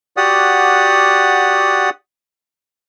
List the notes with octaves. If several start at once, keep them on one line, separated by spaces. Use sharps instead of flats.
F#4 G4 D5 F#5 D#6